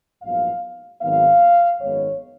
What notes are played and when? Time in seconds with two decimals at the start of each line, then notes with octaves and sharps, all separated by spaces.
0.23 A#1 G#2 F#3 B3 F5
1.01 G#1 G#2 D#3 F#3 B3 F5
1.80 G#1 F#2 D#3 G#3 B3 C#5